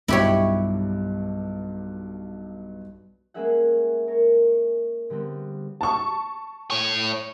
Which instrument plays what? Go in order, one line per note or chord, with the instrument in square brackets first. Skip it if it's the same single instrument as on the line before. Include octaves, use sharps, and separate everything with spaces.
[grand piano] B1 G2 F4 [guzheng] E4 G4 C#5
[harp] G#3 A#3 C#4 G#4 E5 F#5
A#4 C#5
D3 G3 B3 C4
[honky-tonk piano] A5 C#6
[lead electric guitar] A2 C#5